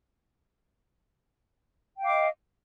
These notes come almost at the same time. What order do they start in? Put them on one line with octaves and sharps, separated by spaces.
G5 F5 D6 D#5